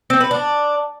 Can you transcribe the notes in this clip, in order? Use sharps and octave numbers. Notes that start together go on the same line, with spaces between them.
C4
B4
D4